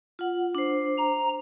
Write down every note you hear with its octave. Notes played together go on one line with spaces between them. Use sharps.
F4 F#5
D4 C5
A#5